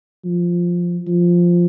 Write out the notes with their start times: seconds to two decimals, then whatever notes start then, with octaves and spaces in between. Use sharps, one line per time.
0.25 F3
1.07 F3